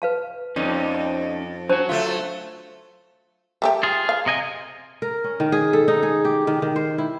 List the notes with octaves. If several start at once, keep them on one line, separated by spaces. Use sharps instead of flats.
B4 F5 A5
F2 C#4 D#4
A5
F#3 D4 F#4 C5 A5
A3 F4 F5
G3 A3 G4
F4 G#4
F5
C3 D#5 G#5
A#4
C#4
D#3
G#4
A4
D#4
G#4
G4
D#3
D#3
C5
E4